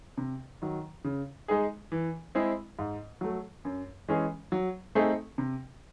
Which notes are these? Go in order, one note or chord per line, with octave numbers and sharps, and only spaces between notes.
C3
D#3 F#3
C#3
G#3 D#4 G#4
E3
G#3 C4 E4 G#4
G#2
F#3 A3
F#2
E3 G#3 C#4 G#4
F#3
A3 C4 D#4 G#4
C3